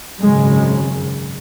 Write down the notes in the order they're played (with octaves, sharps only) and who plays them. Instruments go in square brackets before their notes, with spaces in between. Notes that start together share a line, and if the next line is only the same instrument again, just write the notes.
[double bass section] G#1 F#2 C#3 G#3